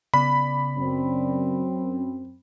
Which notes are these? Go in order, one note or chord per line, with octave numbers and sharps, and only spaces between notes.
C#3 B3 D5 B5
F#2 C4